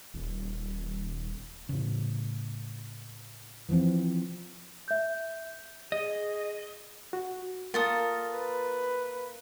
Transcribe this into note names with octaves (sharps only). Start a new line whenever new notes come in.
D#1
A2 C#3
E3 F3 C4
E5 G6
G#4 D#5
F#4
A#3 F4 A4 A#4 D#6
B4